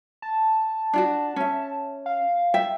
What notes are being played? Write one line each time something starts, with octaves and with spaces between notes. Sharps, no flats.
A5
D4 F4 F#4
C#4 E5
F5
E5 G5